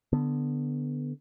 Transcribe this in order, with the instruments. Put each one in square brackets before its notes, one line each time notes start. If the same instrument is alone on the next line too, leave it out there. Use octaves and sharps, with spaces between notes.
[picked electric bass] D3 B3